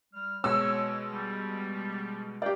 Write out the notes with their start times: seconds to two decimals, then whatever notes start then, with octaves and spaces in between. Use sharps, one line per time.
0.14 G3 F6
0.44 B2 G#3 C#5 E6
1.12 G3
2.42 D4 G4 D5 F5 G5